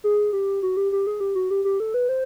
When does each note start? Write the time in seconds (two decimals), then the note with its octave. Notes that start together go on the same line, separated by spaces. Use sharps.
0.04 G#4
0.33 G4
0.63 F#4
0.77 G4
0.92 G4
1.07 G#4
1.20 G4
1.35 F#4
1.51 G4
1.65 G4
1.80 A4
1.94 B4
2.09 C5